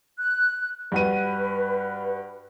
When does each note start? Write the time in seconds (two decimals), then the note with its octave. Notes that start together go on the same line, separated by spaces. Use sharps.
0.19 F#6
0.92 G2 F#4 B4 D#7